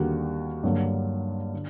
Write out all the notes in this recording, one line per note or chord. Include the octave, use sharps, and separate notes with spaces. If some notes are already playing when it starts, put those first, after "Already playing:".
Already playing: D#2 D3 G3 A#3 F#4
G2 D3 F#3 A#3
D3